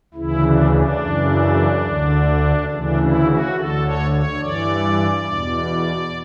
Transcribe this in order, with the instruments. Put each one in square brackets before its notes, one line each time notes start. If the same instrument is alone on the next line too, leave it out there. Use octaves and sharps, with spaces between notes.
[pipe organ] D2 C#3 E3 E4
D4
D4
F#2 C#3 E3
D2 D3
D2 C#3 E3 D4
E4
F#4
D2 D3 A4
C#5
C#5
G2 E3 D5
E2 B2